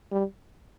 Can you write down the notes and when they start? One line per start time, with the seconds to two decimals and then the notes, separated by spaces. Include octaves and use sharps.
0.12 G3